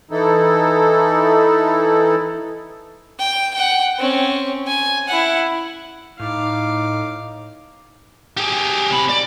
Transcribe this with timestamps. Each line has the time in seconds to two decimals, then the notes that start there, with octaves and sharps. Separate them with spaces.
0.11 E3 D#4 E4 A4
3.19 G5
3.54 F#5 G5
3.99 C4 C#4
4.67 G#5
5.08 E4 F#5
6.19 A2 D#4 F5 D6
8.37 G4 G#4
8.91 C3 B5
9.09 D5